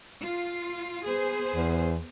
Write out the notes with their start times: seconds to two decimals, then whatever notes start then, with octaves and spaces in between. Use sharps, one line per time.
0.23 F4
1.06 B3 G#4 C5
1.55 E2